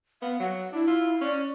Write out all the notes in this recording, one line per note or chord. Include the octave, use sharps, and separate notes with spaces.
B3 F5
F#3 F#5
D4 E4
F4
C#4 D5